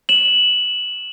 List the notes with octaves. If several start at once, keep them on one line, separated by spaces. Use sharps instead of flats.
E7 F#7